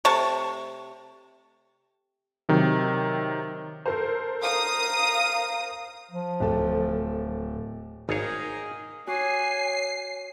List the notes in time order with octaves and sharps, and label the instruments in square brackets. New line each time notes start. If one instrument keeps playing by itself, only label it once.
[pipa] C3 A3 A5 C#6
[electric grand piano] C3 D#3 F#3
[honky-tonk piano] A4 A#4 C5
[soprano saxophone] F5 [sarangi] A#5 [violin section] D#6
[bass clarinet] F3
[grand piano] D1 A4
[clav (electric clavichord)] G#1 C#5 [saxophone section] D#3 A#3 D#4 [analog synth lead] G#4
[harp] F#4 D6 D#6 [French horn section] C#5 [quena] G#5 [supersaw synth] C7